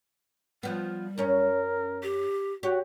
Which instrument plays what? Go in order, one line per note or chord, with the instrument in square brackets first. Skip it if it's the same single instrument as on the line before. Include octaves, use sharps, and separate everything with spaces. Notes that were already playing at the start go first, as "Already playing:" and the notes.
[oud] F3 B3 [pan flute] G3
[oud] F#2 C#4 [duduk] A#4
[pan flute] G4
[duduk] F#4 [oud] G4 C#5